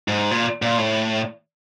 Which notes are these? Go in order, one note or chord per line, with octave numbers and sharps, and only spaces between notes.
G#2
A#2
A#2
A2